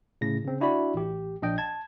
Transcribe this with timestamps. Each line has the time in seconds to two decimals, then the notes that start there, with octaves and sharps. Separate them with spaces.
0.21 A2 C#3 A#6
0.45 C#3 C4
0.61 D4 E4 F#4 D5 B5
0.94 A1 G4
1.42 A#1 D4 D#5 G5
1.58 A5 G#6